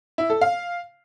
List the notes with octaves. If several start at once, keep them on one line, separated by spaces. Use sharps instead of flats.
E4
A4
F5